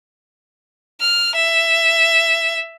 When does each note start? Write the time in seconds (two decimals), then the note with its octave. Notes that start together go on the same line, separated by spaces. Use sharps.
1.00 F6
1.35 E5